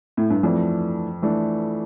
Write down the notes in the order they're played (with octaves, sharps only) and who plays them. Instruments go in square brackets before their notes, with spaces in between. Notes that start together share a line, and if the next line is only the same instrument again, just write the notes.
[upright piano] A2
G2
[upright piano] F2 [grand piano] E3 A3 D4
[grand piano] E3 A3 D4